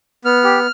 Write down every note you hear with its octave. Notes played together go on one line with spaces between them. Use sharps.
B3 F6
G4